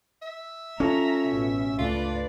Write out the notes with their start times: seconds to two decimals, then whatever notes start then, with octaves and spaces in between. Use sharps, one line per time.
0.22 E5
0.80 C#4 F4 A4 A#5
1.28 A1 B2
1.79 C#2 A3 D4 F4 B4 D5